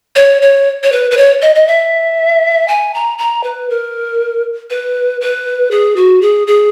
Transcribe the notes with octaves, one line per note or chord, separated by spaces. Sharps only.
C#5
C#5
C#5
B4
B4
C#5
D#5
D#5
E5
G#5
A#5
A#5
B4
A#4
B4
B4
G#4
F#4
G#4
G#4